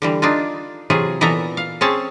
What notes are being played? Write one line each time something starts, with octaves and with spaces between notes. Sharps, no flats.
D3 E3 G3
D4 D#4 F4
C3 E3 F#3 F4 G#4
A#2 E3 B3 A4 E5 A#5
F5
C4 C#4 G#4 C#5 A5